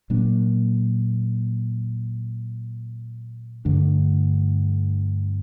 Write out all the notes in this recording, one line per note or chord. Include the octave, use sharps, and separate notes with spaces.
A#2 F#3 A#3 D4
G2 D3 A3 D4